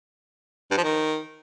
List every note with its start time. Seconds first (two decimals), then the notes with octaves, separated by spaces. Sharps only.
0.71 G2
0.77 F3
0.84 D#3